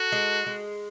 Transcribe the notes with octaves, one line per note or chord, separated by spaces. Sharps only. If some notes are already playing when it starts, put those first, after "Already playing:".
Already playing: F#4 A4
G#3
G#3